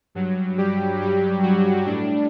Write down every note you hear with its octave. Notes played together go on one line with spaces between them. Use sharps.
G2 F#3
G3 G4
G2 F#3 G3 G4
F#3 F#4
A2 G3 D4